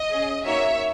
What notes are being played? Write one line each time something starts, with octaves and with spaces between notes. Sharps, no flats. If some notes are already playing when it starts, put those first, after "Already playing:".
Already playing: D#5
C#4 G#4
A#3 D#4 F#4 C#5 E5